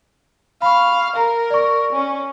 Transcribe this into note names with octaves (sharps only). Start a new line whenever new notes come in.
F5 B5 C#6
A#4 A#5
D5 C#6
C#4